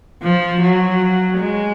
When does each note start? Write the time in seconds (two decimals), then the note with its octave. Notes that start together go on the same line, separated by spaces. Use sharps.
0.23 F3
0.61 F#3
1.38 G#3